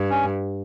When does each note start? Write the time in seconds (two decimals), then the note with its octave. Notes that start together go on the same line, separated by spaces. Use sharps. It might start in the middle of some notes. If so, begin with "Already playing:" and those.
Already playing: G2
0.10 C#4